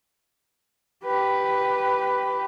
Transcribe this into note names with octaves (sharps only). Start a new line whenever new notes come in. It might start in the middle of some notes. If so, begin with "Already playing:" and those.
G4 B4